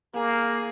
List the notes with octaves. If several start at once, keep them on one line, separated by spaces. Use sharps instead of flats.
A#3 G#4